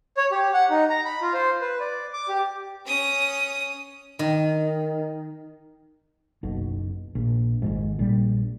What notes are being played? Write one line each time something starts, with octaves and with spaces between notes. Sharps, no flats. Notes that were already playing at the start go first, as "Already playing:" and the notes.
C#5
G4
F#5
D#4
A#5
B5
F4
C5
B4
D5
D6
G4
C#4 D#6
D#3
F#1 B1 B2
A#1
G#1 F2 G#2
A#1 G3